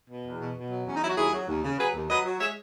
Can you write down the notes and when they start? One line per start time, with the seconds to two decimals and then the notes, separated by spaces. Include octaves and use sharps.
0.09 B2
0.25 E2
0.40 B2
0.56 B2
0.71 F#3
0.86 E2 C#4
0.95 D#4
1.01 F#3 E4
1.09 F#4
1.17 D#2 E4 G#4
1.33 F#3
1.48 D#2
1.63 C#3
1.78 F#3 G#4 B4
1.94 D#2
2.09 F#3 B4 D#5
2.25 F#3
2.40 G#3 C#5 E5